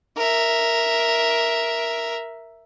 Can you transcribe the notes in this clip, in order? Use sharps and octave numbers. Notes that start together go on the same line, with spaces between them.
A#4 E5